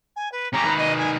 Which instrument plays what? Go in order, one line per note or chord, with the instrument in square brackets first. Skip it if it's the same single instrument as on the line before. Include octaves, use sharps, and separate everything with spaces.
[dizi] G#5
B4
[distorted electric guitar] C#4 G4 [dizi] A#5
[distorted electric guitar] D#3 B4
[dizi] D#5
G#5